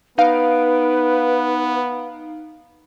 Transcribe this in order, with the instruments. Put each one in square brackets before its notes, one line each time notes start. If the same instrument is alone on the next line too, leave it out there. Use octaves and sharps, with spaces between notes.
[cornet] B3 [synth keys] D#4 F5 D7 [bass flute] B4